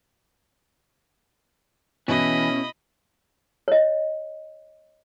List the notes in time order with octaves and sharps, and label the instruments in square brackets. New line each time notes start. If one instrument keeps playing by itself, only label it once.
[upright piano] B2 E4 [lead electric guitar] E3 [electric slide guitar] C#4 [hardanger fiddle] D#5 B5
[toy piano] C#5 D#5